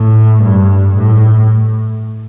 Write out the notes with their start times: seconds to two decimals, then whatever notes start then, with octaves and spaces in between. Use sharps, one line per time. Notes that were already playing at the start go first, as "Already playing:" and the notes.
Already playing: A2
0.43 G2
0.96 A2